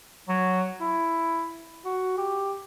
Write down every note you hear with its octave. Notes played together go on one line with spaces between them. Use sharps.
F#3
E4
F#4
G4